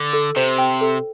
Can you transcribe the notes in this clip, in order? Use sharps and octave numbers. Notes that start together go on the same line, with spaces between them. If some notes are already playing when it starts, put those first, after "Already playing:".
Already playing: D3
A4
C3 C5
G5
A4